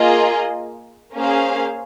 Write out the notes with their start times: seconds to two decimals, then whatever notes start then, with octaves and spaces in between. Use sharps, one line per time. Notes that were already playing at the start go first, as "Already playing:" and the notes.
Already playing: A#3 F4 G#4 D#5
1.15 A#3 C#4 G#4 C5 F5